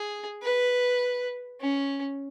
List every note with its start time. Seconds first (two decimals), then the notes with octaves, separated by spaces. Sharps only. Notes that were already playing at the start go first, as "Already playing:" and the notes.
Already playing: G#4
0.43 B4
1.61 C#4